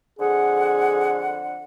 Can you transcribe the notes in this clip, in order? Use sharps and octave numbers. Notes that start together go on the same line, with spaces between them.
F2 D3 G#4 F#5